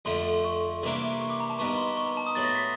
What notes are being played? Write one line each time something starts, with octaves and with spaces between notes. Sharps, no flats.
F2 D3 F3 A3 C6
C6
C#6
C3 E3 G3 A#3 D4
C#6
D6
A#5
A5
G2 D#3 G3 B3 C#6
C6
C#6
A#5
A5
D#6
A2 F#3 B3 A6
A#6
B6